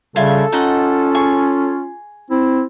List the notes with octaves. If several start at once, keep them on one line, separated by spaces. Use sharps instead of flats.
C#3 G3 F4 A4 E5 G#5
C#4 D#4 F4 D#5 F#5
G#4 G#5 C#6
C4 E4